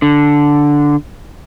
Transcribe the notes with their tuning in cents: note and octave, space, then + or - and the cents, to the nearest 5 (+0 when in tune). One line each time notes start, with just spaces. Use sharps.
D3 -5